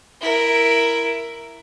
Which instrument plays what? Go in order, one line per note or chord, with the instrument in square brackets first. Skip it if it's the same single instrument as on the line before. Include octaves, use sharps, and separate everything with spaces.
[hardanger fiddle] E4 A#4